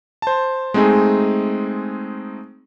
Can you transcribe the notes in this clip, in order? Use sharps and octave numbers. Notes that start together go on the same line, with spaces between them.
C5 A5
G#3 A3 C4 D#4 G#4